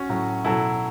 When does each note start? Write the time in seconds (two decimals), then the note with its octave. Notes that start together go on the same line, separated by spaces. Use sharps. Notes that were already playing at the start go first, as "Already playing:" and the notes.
Already playing: C#4 F#4
0.09 A2 F#3
0.45 B2 F#3 E4 A4